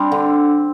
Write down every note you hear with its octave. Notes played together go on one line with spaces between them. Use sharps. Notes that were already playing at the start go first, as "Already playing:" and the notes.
Already playing: G3 C4 D4
D3